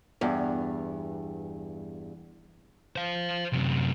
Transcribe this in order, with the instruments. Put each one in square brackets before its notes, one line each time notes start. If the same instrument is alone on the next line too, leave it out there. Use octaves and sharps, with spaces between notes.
[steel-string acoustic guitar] E2 G2
[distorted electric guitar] C5 F5
F#2 C3